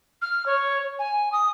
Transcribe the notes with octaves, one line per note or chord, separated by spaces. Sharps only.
F6
C#5
G#5
D#6